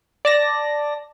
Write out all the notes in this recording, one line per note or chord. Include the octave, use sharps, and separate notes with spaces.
D5 A5 A#6